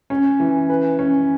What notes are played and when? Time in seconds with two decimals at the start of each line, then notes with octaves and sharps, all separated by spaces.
0.10 C#4
0.40 E3
0.69 B4
0.99 C#4